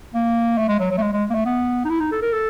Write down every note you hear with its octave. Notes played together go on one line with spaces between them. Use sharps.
A#3
A3
G#3
F#3
F#3
A3
G#3
G#3
A#3
A3
B3
D#4
E4
D#4
A4
A#4
A4